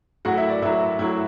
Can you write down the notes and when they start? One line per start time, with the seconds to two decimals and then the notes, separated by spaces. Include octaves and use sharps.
0.25 A2 F#3 F#4 F#5
0.37 E4 E5
0.50 D5
0.62 A2 F#3 E4 E5
0.99 A2 F#3 E4 E5